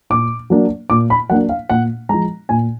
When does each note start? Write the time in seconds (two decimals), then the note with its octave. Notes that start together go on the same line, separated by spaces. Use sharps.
0.10 A#2 D6
0.50 F#3 A#3 D4
0.90 A#2 D6
1.10 B5
1.30 F#3 A#3 D4 F#5
1.49 F5
1.69 A#2 F#5
2.09 F3 G#3 A#5
2.49 A#2 G#5